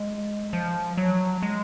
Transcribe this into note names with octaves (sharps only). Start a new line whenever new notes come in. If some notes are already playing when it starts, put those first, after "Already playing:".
Already playing: G#3
F3
F#3
G#3